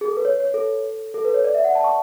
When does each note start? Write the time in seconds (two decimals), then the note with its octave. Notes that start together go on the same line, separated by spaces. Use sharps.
0.01 G#4
0.08 A4
0.17 B4
0.25 C#5
0.40 C#5
0.54 A4
1.14 A4
1.25 B4
1.34 C#5
1.44 D5
1.54 E5
1.64 F#5
1.75 A5
1.84 C#6